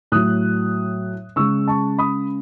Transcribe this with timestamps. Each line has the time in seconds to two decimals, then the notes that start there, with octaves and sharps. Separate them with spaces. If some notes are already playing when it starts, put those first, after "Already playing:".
0.12 A2 F#3 D#6 F#6
1.36 C#3 G#3 C#6 E6
1.68 A5 C#6
1.98 B5 D#6